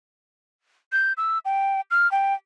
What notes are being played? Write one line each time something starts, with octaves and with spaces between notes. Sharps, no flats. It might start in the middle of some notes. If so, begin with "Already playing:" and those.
G6
E6
G5
F6
G5